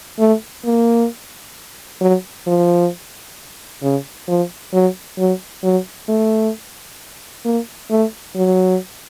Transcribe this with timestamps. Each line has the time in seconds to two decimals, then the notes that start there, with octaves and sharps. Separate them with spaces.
0.19 A3
0.65 A#3
2.01 F#3
2.47 F3
3.83 C#3
4.28 F3
4.73 F#3
5.18 F#3
5.64 F#3
6.09 A3
7.45 A#3
7.90 A3
8.35 F#3